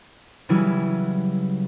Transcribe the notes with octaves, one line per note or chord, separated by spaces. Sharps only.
C#3 E3 F#3 G3 E4 B4